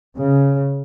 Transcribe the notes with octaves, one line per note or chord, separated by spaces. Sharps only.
C#3